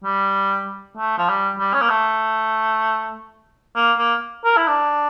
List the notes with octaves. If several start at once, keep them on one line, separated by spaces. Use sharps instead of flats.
G3
A3
F3
G3
G3
C#4
A#3
A3
A#3
A#3
A#4
E4
D4